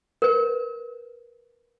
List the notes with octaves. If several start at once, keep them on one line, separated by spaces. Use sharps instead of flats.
A#4 B4